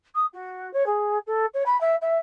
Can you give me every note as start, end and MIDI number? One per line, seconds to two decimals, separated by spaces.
0.15 0.26 87
0.33 0.71 66
0.73 0.85 73
0.86 1.18 68
1.26 1.45 69
1.54 1.63 73
1.66 1.79 83
1.80 1.95 76
2.01 2.18 76